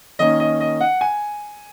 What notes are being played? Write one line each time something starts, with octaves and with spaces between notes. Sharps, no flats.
D#3 A#3 C#4 D#5
D#5
D#5
F#5
G#5